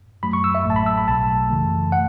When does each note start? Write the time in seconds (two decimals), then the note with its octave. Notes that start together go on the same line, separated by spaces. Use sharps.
0.23 F#2 F#3 A3 B5
0.33 C#6
0.44 E6
0.55 E5
0.65 A1 A2 F#3 A3 A5
0.76 B5
0.86 E6
0.98 B5
1.07 B1 B2 F#3 A3 A5
1.50 F#2 C#3 E3 A3
1.92 F#5